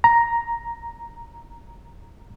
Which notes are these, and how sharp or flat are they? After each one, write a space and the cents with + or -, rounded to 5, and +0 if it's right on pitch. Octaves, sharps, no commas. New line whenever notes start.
A#5 +5